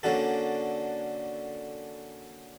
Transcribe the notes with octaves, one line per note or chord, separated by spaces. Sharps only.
D3 A#3 C#4 D4 F#4 A4